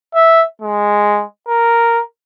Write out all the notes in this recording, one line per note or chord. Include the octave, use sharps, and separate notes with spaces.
E5
G#3
A#4